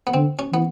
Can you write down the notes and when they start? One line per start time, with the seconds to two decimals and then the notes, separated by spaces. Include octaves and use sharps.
0.07 B3
0.14 D3 C4
0.39 C#4
0.52 E3 B3